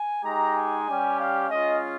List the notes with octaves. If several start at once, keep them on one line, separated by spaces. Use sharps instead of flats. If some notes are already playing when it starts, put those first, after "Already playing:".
Already playing: G#5
G#3 D#4 G4 A#5
G#5
G3 C#4 G4
F5
G#3 C#4 F4 D#5